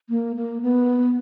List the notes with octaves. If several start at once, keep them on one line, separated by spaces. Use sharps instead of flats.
A#3
A#3
B3